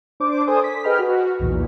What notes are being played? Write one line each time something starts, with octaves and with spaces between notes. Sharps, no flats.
D4 C5 D6
A4 A#4 C5 D5 G#5 D#6
B6
G#4 B4 D#5 G5 B5 F6
F#4
B1 E2 A#2